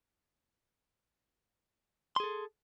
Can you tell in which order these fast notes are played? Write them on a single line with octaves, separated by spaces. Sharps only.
C6 G#4 A4